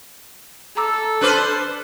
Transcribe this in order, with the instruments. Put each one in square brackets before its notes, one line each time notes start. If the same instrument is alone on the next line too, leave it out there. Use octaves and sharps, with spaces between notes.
[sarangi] A4 [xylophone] A#5 D6 E6
[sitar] D4 B4 C5 [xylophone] A5 D6 F6